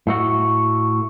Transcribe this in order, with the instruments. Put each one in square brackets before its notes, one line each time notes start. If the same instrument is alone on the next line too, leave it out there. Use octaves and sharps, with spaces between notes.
[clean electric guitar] A2 A3 F#4